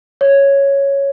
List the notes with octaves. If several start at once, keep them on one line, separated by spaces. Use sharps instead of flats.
C#5